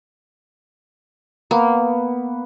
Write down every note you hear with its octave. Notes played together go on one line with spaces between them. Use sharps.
A#3 B3